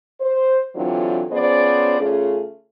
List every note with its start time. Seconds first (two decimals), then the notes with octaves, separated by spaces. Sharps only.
0.20 C5
0.75 G2 D3 E3 F#3 C4 F4
1.31 F3 B3 C#4 G#4 C5 D5
2.00 C#3 A3 C#4 F4 G#4